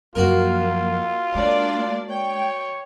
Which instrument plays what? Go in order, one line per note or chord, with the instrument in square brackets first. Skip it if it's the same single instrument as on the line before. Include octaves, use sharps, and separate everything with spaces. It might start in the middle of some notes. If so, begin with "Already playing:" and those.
[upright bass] F#2 F3 [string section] A#3 [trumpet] F4 [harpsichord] F#4 A#4
[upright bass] G#3 [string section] A#3 D4 D5
[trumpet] C#5 [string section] G5